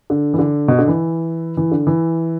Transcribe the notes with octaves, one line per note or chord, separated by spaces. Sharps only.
D3
E3
D3
B2
D3
E3
E3
D3
E3